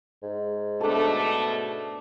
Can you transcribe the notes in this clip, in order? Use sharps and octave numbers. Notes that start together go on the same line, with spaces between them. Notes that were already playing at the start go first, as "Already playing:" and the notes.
G#2
B2 A3 D4 A4